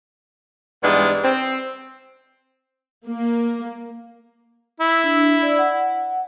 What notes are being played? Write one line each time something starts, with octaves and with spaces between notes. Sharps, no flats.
G#2 E3 G3 G#3 B3 D4
C4
A#3
E4
D4
D5
F#5